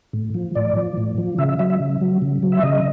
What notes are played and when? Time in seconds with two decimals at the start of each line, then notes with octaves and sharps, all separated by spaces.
0.13 A2
0.34 F3
0.55 A2 D5
0.76 F3
0.97 A2
1.18 F3
1.38 C#3 E5
1.49 E5
1.59 F#3 E5
1.70 E5
1.80 C#3
2.01 F#3
2.22 C#3
2.43 F#3
2.52 E5
2.63 C#3 D#5